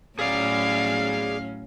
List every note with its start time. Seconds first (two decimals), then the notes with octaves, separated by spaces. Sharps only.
0.19 A2 F#3 C#4 G#4 D5 F5 F6